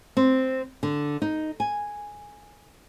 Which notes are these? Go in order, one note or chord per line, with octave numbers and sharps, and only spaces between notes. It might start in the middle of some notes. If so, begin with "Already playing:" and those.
C4
D3
D#4
G#5